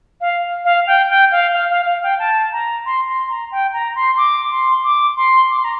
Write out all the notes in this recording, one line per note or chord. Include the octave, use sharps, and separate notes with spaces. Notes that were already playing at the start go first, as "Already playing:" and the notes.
F5
F5
G5
G5
F5
F5
F5
F5
G5
A5
A#5
C6
C6
A#5
G5
A#5
C6
D6
C6
D6
C6
D6
C6
A#5